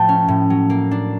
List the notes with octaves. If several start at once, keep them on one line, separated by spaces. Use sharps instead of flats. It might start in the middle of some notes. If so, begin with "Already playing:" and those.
Already playing: A2 F3 A3 G5 A5
C#4
A2
F#3
A#3
D4